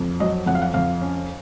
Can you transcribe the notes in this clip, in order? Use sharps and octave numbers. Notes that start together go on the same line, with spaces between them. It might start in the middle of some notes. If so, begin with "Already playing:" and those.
Already playing: F2
F#3 D#5
F2 F#5
F5
F#5
F2 F5
C#4